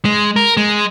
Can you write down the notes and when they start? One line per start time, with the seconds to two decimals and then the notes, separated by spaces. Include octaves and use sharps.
0.05 G#3
0.36 A#4
0.57 G#3